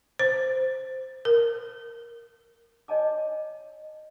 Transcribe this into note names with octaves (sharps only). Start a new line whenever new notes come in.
C5
A#4
C#5 D#5 G#5 A5 D6